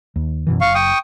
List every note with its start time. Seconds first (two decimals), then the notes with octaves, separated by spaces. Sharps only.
0.16 D#2
0.47 F#2 B2 E3
0.61 F#1 F5 C#6
0.75 G5 C#6 D#6